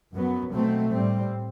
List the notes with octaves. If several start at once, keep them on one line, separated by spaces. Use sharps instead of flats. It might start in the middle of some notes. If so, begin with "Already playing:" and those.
F#2 F#3 B3
B2 F#3 A3 C4
A2 G3 C4